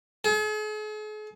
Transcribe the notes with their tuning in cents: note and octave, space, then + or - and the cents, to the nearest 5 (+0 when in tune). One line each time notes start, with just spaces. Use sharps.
G#4 +45